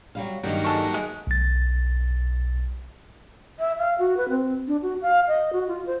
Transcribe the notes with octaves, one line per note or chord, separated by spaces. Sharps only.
F#3 G3 F5
G2 D#3 F#3 G3 A#3
G#3 A4 C#6
G#3
B1 A6
E5
F5
F#4
B4
C4
D4
F#4
F5
D#5
F#4
F4
C5